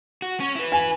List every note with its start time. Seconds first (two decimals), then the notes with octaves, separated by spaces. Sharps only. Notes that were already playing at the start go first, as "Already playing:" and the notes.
0.22 F#4
0.40 C#4 C#5
0.55 E4 B4
0.72 G#5